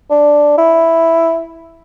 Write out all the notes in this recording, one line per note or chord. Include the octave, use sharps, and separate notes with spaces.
D4
E4